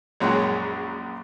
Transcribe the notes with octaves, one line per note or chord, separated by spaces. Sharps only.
A#1 F#2 G#3 C#5 F#5 G5